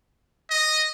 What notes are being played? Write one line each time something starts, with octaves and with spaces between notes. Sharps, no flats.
D#5